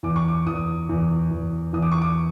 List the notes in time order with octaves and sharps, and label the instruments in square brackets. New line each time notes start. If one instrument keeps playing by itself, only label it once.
[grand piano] E2 D6
C#6
D6
E2 D#6
E2
E2
E2 D#6
D6
C#6
D6